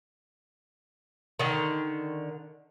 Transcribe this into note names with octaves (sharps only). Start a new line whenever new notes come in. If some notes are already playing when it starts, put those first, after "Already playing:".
D3 D#3